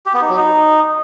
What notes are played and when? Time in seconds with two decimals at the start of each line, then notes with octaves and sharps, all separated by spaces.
0.06 G4
0.14 B3
0.22 D#4
0.29 F#3
0.37 D#4